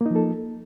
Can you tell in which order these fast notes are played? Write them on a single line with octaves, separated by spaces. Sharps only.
A#3 D#4 F3 A4